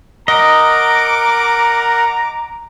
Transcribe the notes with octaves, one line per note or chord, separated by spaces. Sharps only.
A#4 D#5 F#5 A#5 D6